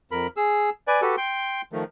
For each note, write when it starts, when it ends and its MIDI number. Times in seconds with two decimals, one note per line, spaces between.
0.11 0.27 41
0.11 0.27 70
0.11 0.27 83
0.37 0.70 68
0.37 0.70 88
0.87 1.01 71
0.87 1.01 74
0.87 1.01 80
1.02 1.16 66
1.02 1.16 67
1.02 1.16 69
1.02 1.16 71
1.17 1.62 79
1.17 1.62 84
1.72 1.84 51
1.72 1.84 53
1.72 1.84 57